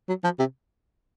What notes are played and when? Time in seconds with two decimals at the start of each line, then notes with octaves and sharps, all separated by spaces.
0.08 F#3
0.24 F3
0.39 C3